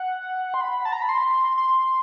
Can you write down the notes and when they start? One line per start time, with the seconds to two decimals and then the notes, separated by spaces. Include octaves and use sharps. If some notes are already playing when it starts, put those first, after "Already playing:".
Already playing: F#5
0.54 C6
0.61 B5
0.85 A5
0.92 A#5
1.02 B5
1.09 C6
1.58 C6